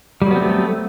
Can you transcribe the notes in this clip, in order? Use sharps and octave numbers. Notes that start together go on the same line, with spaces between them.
F#3 G3 A3 B3 C4